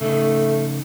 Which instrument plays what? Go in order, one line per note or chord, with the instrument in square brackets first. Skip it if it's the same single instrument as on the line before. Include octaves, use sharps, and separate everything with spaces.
[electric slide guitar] C#3 D#4 [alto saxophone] A3